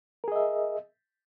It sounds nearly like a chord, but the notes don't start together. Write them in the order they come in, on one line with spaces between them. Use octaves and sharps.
A#4 G#4 D#5 E5